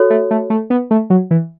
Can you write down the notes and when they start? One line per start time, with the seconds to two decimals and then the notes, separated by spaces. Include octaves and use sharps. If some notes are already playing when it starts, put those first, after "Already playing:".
Already playing: F#4 A4 C#5
0.10 A3
0.31 A3
0.50 A3
0.70 B3
0.91 A3
1.10 F#3
1.31 E3